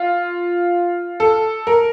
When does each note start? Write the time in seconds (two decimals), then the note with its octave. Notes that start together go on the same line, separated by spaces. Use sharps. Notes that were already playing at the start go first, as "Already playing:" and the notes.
Already playing: F4
1.20 A4
1.67 A#4